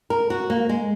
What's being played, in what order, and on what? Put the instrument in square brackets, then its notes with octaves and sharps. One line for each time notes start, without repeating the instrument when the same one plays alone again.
[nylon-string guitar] A#4
F#4
A#3
G#3